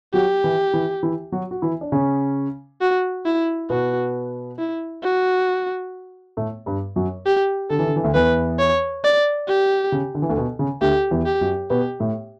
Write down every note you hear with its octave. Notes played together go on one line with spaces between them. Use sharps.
F#3 F#4 G4
E3 E4
E3 E4
E3 E4
F#3 F#4
F#4
E3 E4
D4
C#3 C#4
F#4
E4
B2 B3 F#4
E4
F#4
A2 A3
G2 G3
F#2 F#3
G4
D3 A4
E3
D3
E3
D2 D3
E2 E3 B4
C#5
D5
G4
C#3
D3
E3
D2 D3
B2
C#3
D2 D3 G4
E2 E3
G4
F#2 F#3
B2 B3 G4
A2 A3